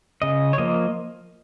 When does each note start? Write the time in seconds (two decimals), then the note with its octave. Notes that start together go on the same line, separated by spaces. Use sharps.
0.22 C#3 D#5
0.53 C#5
0.58 F3 A#3 D#5